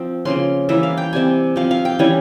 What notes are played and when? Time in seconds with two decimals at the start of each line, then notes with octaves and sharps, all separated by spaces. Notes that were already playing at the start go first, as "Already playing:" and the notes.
Already playing: F3 C4
0.25 C#3 F3 A#3 C#4 C6
0.69 E3 G3 A#3 C#4 E5
0.83 F5
0.98 G5
1.13 C3 G3 C4 G#5
1.56 F3 C4 F5
1.71 F5
1.85 G5
1.99 E3 G3 C#4 G#5